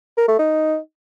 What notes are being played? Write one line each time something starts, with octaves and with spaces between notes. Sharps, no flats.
A#4
A3
D#4